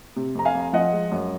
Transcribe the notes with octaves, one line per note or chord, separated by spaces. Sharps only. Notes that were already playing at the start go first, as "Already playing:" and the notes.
C3
F2 A#5
F5 G#5
F2
F3 D#5 F#5
G#3
F#2